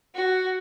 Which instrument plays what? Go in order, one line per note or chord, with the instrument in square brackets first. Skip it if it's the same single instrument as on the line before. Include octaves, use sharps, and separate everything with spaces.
[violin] F#4